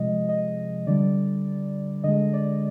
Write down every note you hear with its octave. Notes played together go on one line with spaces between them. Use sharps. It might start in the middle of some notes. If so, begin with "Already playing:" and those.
Already playing: C3 F3 G#3 D#5
D#5
D3 G3 D5
D3 G#3 D#5
D5